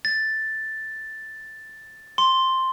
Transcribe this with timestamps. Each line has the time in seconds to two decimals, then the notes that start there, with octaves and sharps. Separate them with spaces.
0.05 A6
2.18 C6